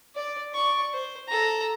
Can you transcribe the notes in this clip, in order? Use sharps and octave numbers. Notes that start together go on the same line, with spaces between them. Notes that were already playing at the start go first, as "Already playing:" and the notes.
D5
D5 C#6
C5
A4 A#5